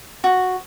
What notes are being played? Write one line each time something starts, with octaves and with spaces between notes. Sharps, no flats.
F#4